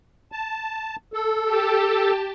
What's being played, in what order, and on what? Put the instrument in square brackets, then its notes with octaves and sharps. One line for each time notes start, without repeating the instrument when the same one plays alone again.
[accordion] A5
A4
[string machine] G4 A5